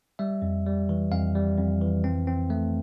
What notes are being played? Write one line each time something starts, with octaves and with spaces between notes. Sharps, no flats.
G3 E5
F2
G3
E3
F2 F5
G3
F2
E3
C4
C4
A3